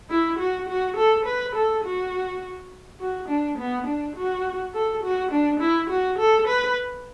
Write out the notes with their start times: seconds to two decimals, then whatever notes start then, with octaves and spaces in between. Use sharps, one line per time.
0.10 E4
0.39 F#4
0.68 F#4
0.97 A4
1.26 B4
1.55 A4
1.84 F#4
3.00 F#4
3.28 D4
3.58 B3
3.87 D4
4.16 F#4
4.74 A4
5.03 F#4
5.32 D4
5.60 E4
5.90 F#4
6.19 A4
6.47 B4